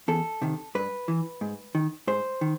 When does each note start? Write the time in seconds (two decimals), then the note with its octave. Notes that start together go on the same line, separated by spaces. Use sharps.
0.08 E2 A4
0.42 C3 D#3
0.75 G2 B4
1.08 E3
1.41 G#2
1.75 D#3
2.07 G#2 C5
2.41 D#3